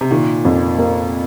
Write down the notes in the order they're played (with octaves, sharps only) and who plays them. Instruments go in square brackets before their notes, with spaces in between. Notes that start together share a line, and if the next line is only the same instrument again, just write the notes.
[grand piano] C3
[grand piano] A#2 [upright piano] D#3
[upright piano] F2
A#3